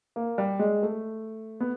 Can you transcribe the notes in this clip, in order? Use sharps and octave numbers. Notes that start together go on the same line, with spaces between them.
A#3
G3
G#3
A3
B3